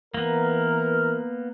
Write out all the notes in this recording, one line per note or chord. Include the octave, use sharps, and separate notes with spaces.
E3 A#3 B3 A#4